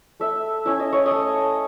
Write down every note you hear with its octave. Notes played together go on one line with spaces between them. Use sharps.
A3 E5
C#4 E4 E5
D#5
C#5
D#5
A3